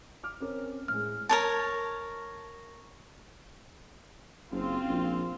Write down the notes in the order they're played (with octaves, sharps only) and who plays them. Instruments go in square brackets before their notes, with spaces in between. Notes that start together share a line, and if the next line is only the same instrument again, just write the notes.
[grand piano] D6 F6
C4 C#4 A#4
[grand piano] A2 G#3 [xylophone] F6
[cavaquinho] A#4 C#5 A5
[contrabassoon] F#1 [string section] C4 F4
[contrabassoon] A#1